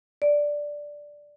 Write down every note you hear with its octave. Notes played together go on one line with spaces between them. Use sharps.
D5